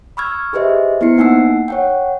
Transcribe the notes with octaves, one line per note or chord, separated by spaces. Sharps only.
B5 C#6 E6 F6 G#6
G4 G#4 B4 C5 D#5 E5
B3 E4 C5 C7 C#7
A#3 D#4 F#5 G#5 E6 C7
C#5 F#5 G5